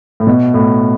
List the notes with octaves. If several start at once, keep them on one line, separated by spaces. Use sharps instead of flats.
A2
B2
A2